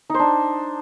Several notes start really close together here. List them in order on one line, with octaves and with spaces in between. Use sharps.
D#4 C5 D4